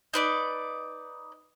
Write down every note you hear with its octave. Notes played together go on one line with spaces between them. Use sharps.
D#4 B4 D5